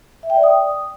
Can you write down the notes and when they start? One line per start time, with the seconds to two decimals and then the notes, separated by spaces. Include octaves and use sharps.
0.23 E5
0.30 G5
0.37 D5
0.43 D#6